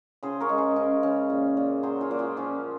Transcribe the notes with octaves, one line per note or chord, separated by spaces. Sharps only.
C#3 G#4 C5
A#4 C#5
G#3
G#4 C5
C#3
C#3
A#2
A#2
F#3 G#4 C5
F4 G#4
A#2
F4 G#4
F3 C#4 F4